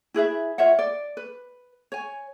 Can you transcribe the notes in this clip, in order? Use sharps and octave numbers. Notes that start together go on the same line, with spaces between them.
E4 G#4 B4 E5
F4 C#5 E5 F#5
D5
B4
C#5 G#5